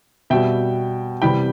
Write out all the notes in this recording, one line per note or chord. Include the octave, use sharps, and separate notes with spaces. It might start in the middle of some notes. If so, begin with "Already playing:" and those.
B2 G3 E5 G5
C3 E3 G3 G5 B5